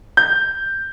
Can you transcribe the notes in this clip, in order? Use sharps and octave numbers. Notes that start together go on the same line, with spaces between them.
G6